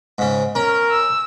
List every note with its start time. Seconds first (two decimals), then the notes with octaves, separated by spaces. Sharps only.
0.18 G#2 C#3
0.55 C#4 A#4
0.91 E6